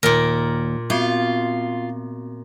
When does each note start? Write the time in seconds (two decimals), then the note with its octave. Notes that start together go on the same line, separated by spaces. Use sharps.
0.03 D#2 A#2 A#4
0.90 B3 C4 F4 F#4